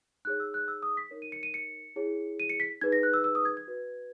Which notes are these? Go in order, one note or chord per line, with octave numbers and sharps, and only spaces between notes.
D#4 G#4 C#5 F#6
E6
F#6
E6
D#6
B6
D#4 A#4 C#5
D#7
C#7
D#7
C#7
E4 G#4 C#5
D#7
C#7
B6
D#4 G#4 B4 G#6
A#6
F#6
E6
E6
D#6
G#6
G#6
F#4 B4